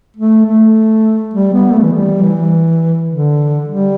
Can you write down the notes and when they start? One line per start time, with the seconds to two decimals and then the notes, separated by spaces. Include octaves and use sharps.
0.16 A3
0.46 A3
1.34 G3
1.53 B3
1.72 A3
1.83 E3
1.93 G3
2.22 E3
3.09 D3
3.68 G3